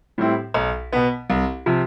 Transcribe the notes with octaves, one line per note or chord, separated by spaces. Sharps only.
A2 G3 C4 E4
B1
B2 B3
C2
C3 F3